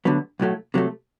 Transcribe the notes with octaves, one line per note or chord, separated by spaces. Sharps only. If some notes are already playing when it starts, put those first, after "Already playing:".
D2 D3 F#3 B3
B1 A2 F#3 A3
C3 F#3 A3